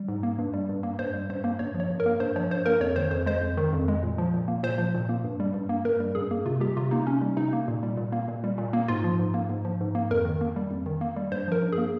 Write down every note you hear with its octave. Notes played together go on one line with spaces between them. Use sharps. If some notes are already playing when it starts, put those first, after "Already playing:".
Already playing: G3
G#2
A#3
G2
G3
G2
A#3
G2 C5
G3
G2 C5
A#3
G2 C#5
F3
C#5
G2
A#4
A#3
G2 C5
F3 C#5
G2 C5
A#3 A#4
F2 C#5
D#3 C5
F2 C5
G#3 C5
F2
D#3
F2
G#3
A#2
F3
A#2
A#3
A#2 C5
F3
A#2
A#3
G2
G3
G2
A#3
G2 A#4
G3
G2 G#4
A#3
C3 F4
G3 G4
C3 F4
A#3 D#4
C3 C#4
G3
C3 D#4
A#3
A#2
G3
A#2
A#3
A#2
G3
A#2
A#3
G#2 F4
F3
G#2
A#3
G#2
F3
G#2
A#3
F2 A#4
D#3
A#3
G3
F2
D#3
A#3
G3
G2 C5
F3 A#4
G2
G#4
A#3